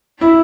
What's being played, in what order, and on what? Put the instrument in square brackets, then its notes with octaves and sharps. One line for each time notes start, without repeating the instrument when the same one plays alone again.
[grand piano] E4